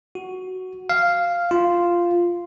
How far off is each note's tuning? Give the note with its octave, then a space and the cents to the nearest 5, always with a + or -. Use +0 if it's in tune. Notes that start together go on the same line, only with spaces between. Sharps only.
F#4 +5
F5 -5
F4 -5